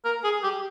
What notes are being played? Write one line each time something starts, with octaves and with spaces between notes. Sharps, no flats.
A#4
G#4
G4